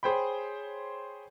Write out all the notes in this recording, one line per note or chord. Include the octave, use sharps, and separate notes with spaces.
G#4 C5 C#5 G5 B5